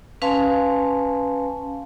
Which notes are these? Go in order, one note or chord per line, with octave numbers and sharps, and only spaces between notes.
C#4 B4 F5 G#5 A5 C6